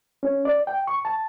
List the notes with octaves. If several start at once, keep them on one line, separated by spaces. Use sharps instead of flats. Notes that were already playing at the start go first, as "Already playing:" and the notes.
C#4
D5
G5
C#6
A5